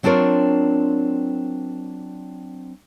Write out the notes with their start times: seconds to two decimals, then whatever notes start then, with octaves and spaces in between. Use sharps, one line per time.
0.03 F#3 C4 D4 F4 A#4 C#5